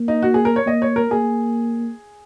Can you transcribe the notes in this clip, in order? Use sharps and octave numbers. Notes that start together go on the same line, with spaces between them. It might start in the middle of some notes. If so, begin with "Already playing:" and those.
Already playing: A#3
D#4
F#4
G#4
A#4
C#5
A#3 D#5
C#5
A#4
A#3 G#4